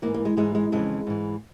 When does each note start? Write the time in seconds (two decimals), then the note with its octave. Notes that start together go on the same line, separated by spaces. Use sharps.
0.02 G#2 E3 A#3
0.14 A#3
0.25 G#3
0.37 G#2 E3 G#3
0.55 G#3
0.72 F2 C#3 E3 G#3
1.07 G#2 E3